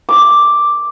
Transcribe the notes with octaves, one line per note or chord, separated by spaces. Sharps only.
D6